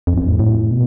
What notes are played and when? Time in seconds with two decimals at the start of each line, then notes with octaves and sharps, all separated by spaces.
0.07 F2
0.18 F2
0.28 A2
0.39 A2
0.71 B2